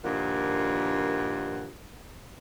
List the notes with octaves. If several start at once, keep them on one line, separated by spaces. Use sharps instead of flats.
G2 A#2 D#3 F3 F#5